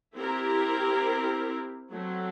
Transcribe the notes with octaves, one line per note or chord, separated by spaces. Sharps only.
C4 E4 G4 A#4
F#3 A3 C4